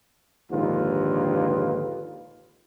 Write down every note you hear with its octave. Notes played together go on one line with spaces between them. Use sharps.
A#1 D#2 G#2 D3 F4 B4